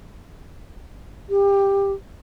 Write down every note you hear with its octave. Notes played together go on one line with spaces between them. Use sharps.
G4